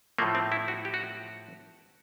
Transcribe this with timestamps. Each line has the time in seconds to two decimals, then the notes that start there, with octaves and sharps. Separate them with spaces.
0.18 A2 F3 A3 A#3
0.35 C4
0.52 E4
0.68 F#4
0.85 G4
0.94 F#4